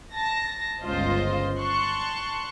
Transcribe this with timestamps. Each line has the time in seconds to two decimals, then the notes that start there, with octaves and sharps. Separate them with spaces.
0.14 A5 A#6
0.84 G1 C#2 F4 C5 D#5
1.60 A5 C6 C#6 F#6